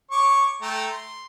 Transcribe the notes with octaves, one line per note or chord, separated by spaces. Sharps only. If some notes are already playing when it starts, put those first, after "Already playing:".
C#5 C#6 D6
A3 G5 A#5
C6